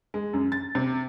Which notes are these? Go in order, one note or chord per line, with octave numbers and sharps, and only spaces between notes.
G#3
F#2
A6
C3